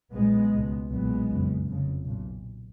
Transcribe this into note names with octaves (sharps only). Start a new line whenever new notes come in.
B1 A#2 G#3 B3
C#2 B2
B1 A#2 G#3 B3
F#1 F2 C#3
F1 F2 C#3
B1 A#2